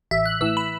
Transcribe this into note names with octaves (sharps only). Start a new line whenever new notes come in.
A1 E5
F#6
A2 E3 E6
B5